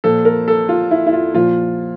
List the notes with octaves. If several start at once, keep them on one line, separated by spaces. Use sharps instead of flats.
A#2 F3 A4
A#4
A4
F4
E4
E4
F4
A#2 F3 F4